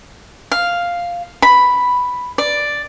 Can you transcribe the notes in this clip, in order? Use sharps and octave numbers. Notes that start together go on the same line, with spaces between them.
F5
B5
D5